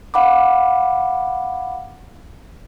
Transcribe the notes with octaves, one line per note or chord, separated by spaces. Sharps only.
F5 F#5 B5 D6